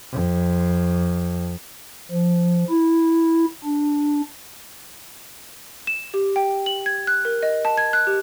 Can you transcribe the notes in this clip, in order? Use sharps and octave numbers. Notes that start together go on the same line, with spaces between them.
F2
F3
E4
D4
E7
G4
G5
F#7
G#6
F#6
A#4
D#5
A5
G#6
F#6
G4